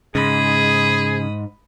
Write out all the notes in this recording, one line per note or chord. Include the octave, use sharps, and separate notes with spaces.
G#2 C#3 G#4 B5 D#6